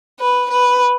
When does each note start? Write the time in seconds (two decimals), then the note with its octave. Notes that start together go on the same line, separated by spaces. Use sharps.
0.20 B4
0.50 B4